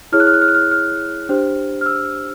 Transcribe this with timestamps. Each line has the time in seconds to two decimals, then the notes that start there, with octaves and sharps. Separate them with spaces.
0.12 E4 G#4 C#5 F6
0.20 F#6
0.27 F6
0.34 F#6
0.42 F6
0.48 F#6
0.54 F6
0.71 F6
1.29 D4 G4 C5
1.81 F6
1.86 E6